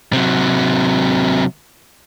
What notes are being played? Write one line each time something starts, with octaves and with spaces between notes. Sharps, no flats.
C3 F#3